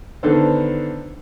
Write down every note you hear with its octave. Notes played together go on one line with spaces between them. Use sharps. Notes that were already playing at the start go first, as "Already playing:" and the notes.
D3 D#3 B3 A4 C5